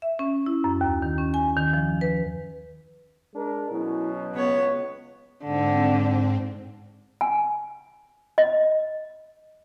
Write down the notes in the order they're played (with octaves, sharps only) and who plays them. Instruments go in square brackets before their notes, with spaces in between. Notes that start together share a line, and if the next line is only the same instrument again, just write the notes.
[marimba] E5
C#4
E4
F#2
D#2
D#3
C#4
G#5
D#3
F3
B4
[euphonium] G#3 [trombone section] D4 A#4
[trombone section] B2 F#3 C#4 [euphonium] E4
[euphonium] C#2 [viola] B3 C#5
[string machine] G#2 C4 [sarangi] D3
[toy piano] G#5
D#5